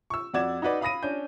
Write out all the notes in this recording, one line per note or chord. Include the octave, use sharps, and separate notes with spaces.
C#6 E6
F2 F#4 D5 G#6 E7
D#4 F#4 B4 D5
F5 B5 D#6 A#6 D#7
C#4 D4 G6